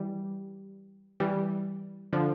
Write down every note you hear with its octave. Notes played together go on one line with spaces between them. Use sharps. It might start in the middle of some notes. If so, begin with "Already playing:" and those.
Already playing: E3 G3
E3 G3
D3 F3